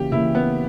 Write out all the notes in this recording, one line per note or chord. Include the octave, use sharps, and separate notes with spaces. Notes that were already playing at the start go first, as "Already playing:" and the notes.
Already playing: C#3 E3 A#3 G4
C#3 E3 A#3 E4
B3